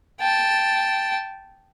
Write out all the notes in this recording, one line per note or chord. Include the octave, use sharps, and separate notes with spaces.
G5 A5